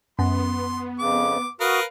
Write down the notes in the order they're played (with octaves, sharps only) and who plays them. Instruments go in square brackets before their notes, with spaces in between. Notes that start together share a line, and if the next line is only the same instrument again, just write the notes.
[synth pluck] F#2 [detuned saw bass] B3 [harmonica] C6
[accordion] F2 C#3 [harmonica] D6
[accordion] F#4 D#6 [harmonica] A#4 B4 F5